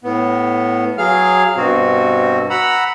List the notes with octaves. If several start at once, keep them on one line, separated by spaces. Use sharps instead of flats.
A2 B3
F#3 G#4 F5 F6
G2 B2 C4 F#4
F#5 A#5 B5 E6